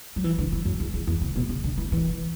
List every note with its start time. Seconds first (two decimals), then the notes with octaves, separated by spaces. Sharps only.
0.16 F#3
0.24 E3
0.38 D3
0.52 E3
0.65 F#2
0.80 E2
0.94 E2
1.07 E2
1.21 C#3
1.36 B2
1.49 C#3
1.64 D3
1.78 E3
1.92 E3